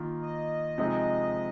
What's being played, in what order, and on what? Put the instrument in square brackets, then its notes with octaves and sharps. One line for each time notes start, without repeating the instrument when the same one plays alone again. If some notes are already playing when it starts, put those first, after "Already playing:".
Already playing: [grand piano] D#3 A#3 F4
[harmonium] D#5
[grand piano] C3 F3 G#3 D#4